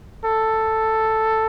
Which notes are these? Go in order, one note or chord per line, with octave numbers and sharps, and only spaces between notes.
A4